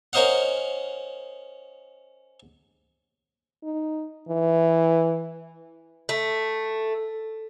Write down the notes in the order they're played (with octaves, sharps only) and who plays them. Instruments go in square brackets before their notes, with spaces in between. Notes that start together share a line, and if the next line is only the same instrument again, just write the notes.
[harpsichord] C#4 A#4 C5 D#5 F5 F#5
[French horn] D#4
E3
[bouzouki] A3